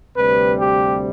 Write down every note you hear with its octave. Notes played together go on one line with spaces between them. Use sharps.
D2 C3 G3 C4 B4
G4